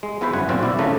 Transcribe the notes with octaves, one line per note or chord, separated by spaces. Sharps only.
G#3
B3 E4 F#4 B4 C5
G1 F#2 F#5 G#5
B1 A#2 C4 F4 F#4
E4 F#4 D5
C#3 F3 A3 C#4 D#4